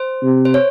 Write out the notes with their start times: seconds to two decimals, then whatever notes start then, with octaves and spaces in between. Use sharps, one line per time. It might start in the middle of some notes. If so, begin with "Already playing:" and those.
Already playing: C5
0.22 C3
0.45 C5
0.54 C#5